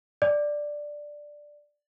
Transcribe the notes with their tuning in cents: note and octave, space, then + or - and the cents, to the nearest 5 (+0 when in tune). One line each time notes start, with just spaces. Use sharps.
D5 +5